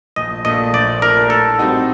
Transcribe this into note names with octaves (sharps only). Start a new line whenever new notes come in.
A#1 D#5
A#2 A3 D4 D#5
A#1 D5
A#2 A3 D4 A#4
A2 A4
G3 C4 D#4 F#4